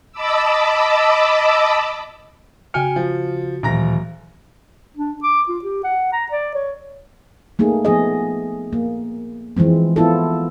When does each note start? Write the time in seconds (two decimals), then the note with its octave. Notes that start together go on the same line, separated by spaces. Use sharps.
0.12 D#5 A5 B5 D6 E6
2.74 C#3 F#4 G5 G#5 F6 C#7
2.96 F3
3.63 D1 A#2 D#3 E3 A#5 A#6
4.97 D4
5.23 D6
5.49 F4
5.64 G4
5.84 F#5
6.13 A#5
6.32 D5
6.55 C#5
7.59 A3 A#3 D#4 G#4
7.85 F3 B3 G#4 D#5
8.73 A#3
9.57 E3 F3 G#3 C4
9.96 B3 E4 F4 A4